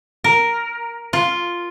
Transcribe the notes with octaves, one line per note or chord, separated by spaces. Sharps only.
A#4
F4